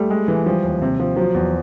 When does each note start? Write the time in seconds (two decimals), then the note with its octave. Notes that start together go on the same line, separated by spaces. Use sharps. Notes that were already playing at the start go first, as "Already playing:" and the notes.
Already playing: G3 A3
0.10 G#3
0.28 E3
0.46 F3 G3
0.63 D#2
0.82 C3
1.00 F3
1.16 F3 F#3
1.34 E2